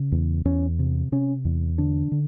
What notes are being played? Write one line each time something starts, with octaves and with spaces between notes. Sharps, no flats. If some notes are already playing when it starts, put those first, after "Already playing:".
Already playing: C#3
E2
E2 C#4
C3
C3 C#4
E2
D3 D4
D3